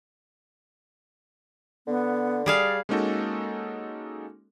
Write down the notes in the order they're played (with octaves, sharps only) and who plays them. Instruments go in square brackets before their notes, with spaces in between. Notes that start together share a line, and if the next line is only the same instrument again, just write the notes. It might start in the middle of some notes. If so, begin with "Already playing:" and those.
[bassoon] D3 [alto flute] B3
[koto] G3 G#4 F5 [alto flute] D5
[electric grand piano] G#3 A#3 C#4 D#4 F#4 A4